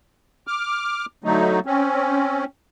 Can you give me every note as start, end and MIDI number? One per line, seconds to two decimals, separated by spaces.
0.47 1.05 86
0.47 1.05 89
1.24 1.59 50
1.24 1.59 54
1.24 1.59 57
1.24 1.59 63
1.66 2.45 60
1.66 2.45 61